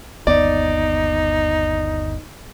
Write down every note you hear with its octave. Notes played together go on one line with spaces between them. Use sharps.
G1 D#2 B3 D#4 D5